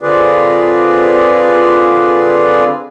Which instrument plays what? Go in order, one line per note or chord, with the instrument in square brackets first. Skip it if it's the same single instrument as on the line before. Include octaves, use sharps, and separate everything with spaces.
[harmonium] D3 C4 F4 G#4 B4 D5